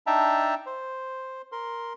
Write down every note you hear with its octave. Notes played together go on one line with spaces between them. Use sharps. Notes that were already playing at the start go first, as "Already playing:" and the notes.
D4 D#4 E5 G5 A5 A#5
C5
A#4 C6